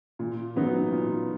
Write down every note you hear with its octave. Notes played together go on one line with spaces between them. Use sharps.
A#2
F#3 B3 D#4
A#2